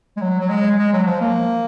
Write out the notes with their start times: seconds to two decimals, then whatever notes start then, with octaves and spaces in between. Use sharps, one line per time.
0.17 G#3
0.21 F#3
0.40 F#3
0.49 G#3
0.78 G#3
0.93 F#3
1.06 F3
1.21 A#3